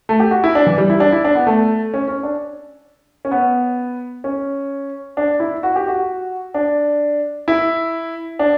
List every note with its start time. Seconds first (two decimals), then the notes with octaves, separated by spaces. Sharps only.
0.09 A3
0.20 G4
0.31 F#4
0.44 E4
0.55 D4
0.67 E3
0.78 G3
0.90 E4
1.00 D4
1.12 E4
1.24 D4
1.35 B3
1.47 A3
1.94 C#4
2.08 C#4
2.23 D4
3.25 C#4
3.31 B3
4.24 C#4
5.17 D4
5.40 E4
5.63 F#4
5.76 G4
5.88 F#4
6.54 D4
7.48 E4
8.39 D4